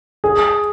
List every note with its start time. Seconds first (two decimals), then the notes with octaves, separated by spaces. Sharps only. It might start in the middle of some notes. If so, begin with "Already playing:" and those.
0.24 G#4